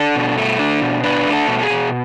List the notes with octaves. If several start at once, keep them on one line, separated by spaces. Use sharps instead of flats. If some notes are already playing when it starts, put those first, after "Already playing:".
Already playing: D4 A4
B2
A3
D4
B2
D4 B4
A3
A4
B2
G#4
B2